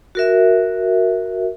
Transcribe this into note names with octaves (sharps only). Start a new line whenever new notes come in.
F#4 A#4 E5